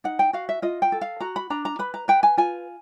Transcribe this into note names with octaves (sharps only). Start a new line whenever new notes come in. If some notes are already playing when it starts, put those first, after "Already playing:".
D#4 F#5
G5
F#4 F5
E5
F4 D#5
G5
A4
F5
F#4 A#5
B5
D4 A#5
A#5
B4 B5
A#5
B4 G5
G#5
F4 G#5